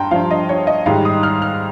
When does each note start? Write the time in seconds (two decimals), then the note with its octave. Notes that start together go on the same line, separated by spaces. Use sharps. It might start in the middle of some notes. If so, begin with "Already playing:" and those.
Already playing: G2 G5 A#5 C6
0.11 G2 F3 F5
0.31 D#5
0.49 C#5
0.67 D#5
0.86 G#2 D#3 G3 F5
1.05 D#6
1.23 F6
1.42 F6